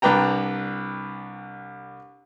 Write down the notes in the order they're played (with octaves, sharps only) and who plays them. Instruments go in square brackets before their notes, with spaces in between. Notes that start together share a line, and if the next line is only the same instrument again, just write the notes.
[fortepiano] C2 D4 B4 G5 A#5